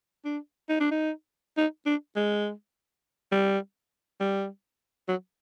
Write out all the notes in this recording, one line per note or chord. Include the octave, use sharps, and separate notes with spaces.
D4
D#4
D4
D#4
D#4
D4
G#3
G3
G3
F#3